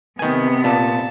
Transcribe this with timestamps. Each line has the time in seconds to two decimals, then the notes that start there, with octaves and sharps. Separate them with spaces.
0.19 C3 D#3 B3 G#5
0.64 A#2 A5